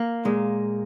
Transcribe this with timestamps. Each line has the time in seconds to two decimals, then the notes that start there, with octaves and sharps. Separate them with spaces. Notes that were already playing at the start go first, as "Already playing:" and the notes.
Already playing: A#3
0.25 A#2 G#3